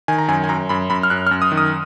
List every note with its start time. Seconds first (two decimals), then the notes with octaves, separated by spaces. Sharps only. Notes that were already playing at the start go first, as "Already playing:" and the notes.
0.08 D#3 G#5
0.18 A#5
0.28 F#2 G#5
0.44 G#5
0.49 F#2 A#5
0.69 F#2 B5
0.90 F#2 B5
1.03 F6
1.10 F#2 F#6
1.27 F6
1.31 F#2
1.42 D#6
1.52 D#3
1.57 D#6